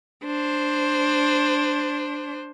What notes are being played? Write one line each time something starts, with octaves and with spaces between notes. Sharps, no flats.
D4 C5